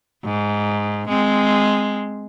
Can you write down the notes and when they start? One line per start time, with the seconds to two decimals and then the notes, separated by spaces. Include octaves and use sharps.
0.24 G#2
1.09 G#3 C4